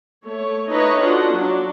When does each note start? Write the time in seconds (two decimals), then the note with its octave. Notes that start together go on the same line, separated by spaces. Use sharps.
0.25 A3 C#5
0.70 D#4 E4 A4 B4 C#5 D#5
1.01 D4 D#4 F4 F#4 A4 F#5
1.33 F#3 D4